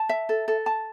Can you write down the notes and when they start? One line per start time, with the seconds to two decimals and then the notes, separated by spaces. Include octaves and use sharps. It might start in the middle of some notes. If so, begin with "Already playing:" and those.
Already playing: A5
0.09 E5
0.29 A4
0.48 A4
0.66 A5